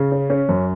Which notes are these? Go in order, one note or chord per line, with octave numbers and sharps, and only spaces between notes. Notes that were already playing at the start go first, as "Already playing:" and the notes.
Already playing: C#3
C#4
C#4
F#2